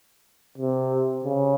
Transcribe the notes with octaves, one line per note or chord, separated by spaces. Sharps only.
C3
C#3